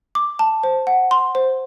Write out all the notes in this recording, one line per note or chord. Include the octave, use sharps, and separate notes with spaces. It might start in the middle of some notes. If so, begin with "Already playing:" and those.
D6
A5
C5
F#5
C6
C5